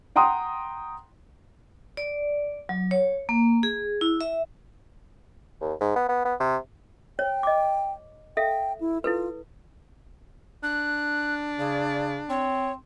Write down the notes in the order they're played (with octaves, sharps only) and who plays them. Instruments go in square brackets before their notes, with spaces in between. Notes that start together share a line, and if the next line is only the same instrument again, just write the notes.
[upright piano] F#5 G5 A#5 C6 D#6
[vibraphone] D5
F#3
C#5
A#3
G#4
E4
E5
[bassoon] D#2
G#2
B3
B3
B3
C3
[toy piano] C#5 [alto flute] G5
[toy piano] D#5 D6
[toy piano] A4 E5 F5 [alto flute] G5
[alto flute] E4
[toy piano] E4 A4 B4 [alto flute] F4
[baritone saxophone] D4 [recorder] F#6
[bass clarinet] C#3 [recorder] D5
[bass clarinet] C4 [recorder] C#5